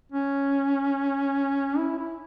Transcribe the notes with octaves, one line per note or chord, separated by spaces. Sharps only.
C#4
E4
E4